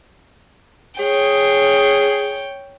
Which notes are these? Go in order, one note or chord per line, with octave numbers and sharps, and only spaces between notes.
G#4 C#5 G5